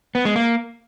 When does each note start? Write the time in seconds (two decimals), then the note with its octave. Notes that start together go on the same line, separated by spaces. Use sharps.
0.15 B3
0.25 G#3
0.36 A#3